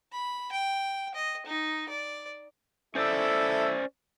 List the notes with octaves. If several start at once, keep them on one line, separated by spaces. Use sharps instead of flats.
B5
G5
D#5
D#4
D5
C#4 E4 A4 C5 D5 E5